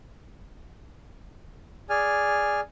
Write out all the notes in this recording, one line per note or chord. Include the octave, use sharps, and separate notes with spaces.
G#4 D5 G#5 F6